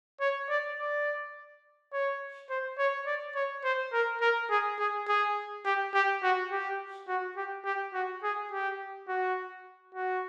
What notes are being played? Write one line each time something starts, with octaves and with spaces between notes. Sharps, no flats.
C#5
D5
D5
C#5
C5
C#5
D5
C#5
C5
A#4
A#4
G#4
G#4
G#4
G4
G4
F#4
G4
F#4
G4
G4
F#4
G#4
G4
F#4
F#4